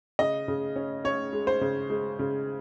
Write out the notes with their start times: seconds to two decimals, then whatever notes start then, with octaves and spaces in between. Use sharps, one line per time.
0.19 C#3 D#5
0.48 C#3
0.76 C#4
1.04 C#4 C#5
1.33 G#3
1.47 C5
1.61 C#3
1.90 G#3
2.19 C#3